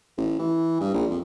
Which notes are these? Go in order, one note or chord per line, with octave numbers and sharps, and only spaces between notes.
A1
E3
G2
A#1
F2